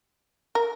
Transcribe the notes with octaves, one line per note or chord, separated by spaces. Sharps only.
A#4